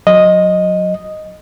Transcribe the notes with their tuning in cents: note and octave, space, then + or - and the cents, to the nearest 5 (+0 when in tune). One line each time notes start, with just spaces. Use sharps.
F#3 -20 D#5 +0